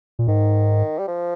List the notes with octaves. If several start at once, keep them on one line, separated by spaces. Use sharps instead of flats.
A#2
G#2 D#3
G3
F3